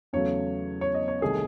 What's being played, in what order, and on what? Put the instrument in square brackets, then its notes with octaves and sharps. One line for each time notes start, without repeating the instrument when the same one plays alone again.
[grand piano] E2 C#3 F#3 A3 C#5
C#5
D#5
C#5
C2 C3 D#3 A3 G#4